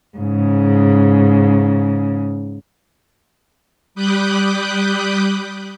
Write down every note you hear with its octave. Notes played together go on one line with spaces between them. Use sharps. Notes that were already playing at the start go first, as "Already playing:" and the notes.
G#2 C#3
G3 B5 D6 D#6 F#6 G6